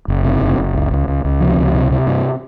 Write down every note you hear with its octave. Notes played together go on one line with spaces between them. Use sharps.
F#1
C3
F#1
F#1
C#2
C#2
C#2
C#2
C3 F3
C#2
C3
C3
G2